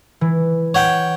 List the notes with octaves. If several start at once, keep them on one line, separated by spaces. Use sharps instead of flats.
E3
C#5 F#5 G5